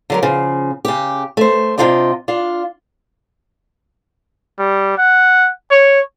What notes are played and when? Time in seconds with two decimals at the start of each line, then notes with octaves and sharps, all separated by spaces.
0.10 D3 F#3 A#4
0.22 C#3 F3
0.85 C#3 G4
1.37 A3 C5
1.78 C3 A3 D4 F4 D#5 G5
2.28 D4 F4
4.59 G3
4.98 F#5
5.71 C#5